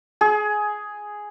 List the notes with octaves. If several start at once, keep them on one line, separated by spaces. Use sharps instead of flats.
G#4